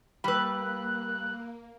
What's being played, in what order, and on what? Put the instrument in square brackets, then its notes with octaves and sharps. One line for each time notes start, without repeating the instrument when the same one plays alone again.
[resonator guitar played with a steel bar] G3 B4 [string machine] A#3 [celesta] B5 E6 [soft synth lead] F#6